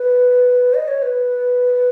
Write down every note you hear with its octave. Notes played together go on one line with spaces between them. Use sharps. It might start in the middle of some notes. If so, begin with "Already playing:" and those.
Already playing: B4
D#5
C#5
B4